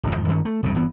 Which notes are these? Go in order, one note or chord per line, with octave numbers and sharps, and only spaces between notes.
D1 G1 E2
E2 G#2 D#3 F3
G2 D#3 C#4
A3
E1 C2 G2 C#3
G1 E3 B3